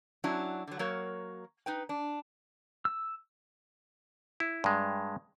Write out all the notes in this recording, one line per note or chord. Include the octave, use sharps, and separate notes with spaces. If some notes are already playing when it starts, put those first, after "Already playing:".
F#3 C#4 D4 E4 F#4
D3 F#3
F#3 A#3 F#4 A#4 C#5
D#4 B4 G5
D4
E6
E4
G2 G#3